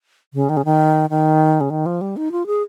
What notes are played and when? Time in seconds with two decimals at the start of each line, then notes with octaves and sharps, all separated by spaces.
0.34 C#3
0.49 D#3
0.57 C#3
0.65 D#3
1.10 D#3
1.61 C#3
1.70 D#3
1.86 F3
2.01 G3
2.17 D#4
2.32 F4
2.46 G#4